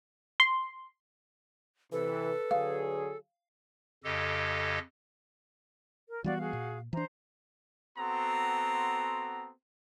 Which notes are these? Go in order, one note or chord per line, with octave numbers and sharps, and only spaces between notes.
C6
C3 E3 A4 B4
D3 F#3 G#4 F5
F2 C#3 G4 A4 D#5
A#4
E3 G3 B3 F#4 D5 F5
F#4 G#4 F5
A#2
E3 D4 C5 A#5
B3 C4 F#4 A4 A#5 C6